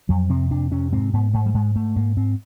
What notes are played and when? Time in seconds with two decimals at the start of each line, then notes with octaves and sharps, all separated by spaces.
0.09 F2 F#3
0.29 C3 C4
0.51 F2 D4
0.71 C3 C#4
0.92 G#2 C4
1.13 G#2 B3
1.33 G#2 A3
1.46 G3
1.54 G#2 G#3
1.76 G#2 A3
1.96 G#2 A#3
2.16 G#2 C4